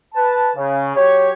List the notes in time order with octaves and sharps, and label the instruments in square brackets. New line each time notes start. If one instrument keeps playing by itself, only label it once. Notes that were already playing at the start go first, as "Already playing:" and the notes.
[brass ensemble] B4 A5
C#3
F#3 G4 C#5